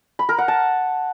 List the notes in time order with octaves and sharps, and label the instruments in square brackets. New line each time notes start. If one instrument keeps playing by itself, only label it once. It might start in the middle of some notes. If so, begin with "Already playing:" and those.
[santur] B5
A#4
F#5
A5